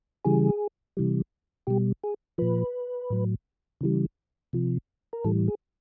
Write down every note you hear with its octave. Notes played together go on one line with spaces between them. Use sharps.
C#3 E3 G3 G#4
C3 E3 G3
B2 G3 G4
G#4
A#2 F3 B4
A2 F#3
C#3 E3 G3
C3 F3
A#4
A2 E3 G3 A4
G#4